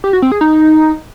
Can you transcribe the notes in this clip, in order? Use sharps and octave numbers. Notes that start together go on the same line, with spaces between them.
G4
F#4
C4
G#4
D#4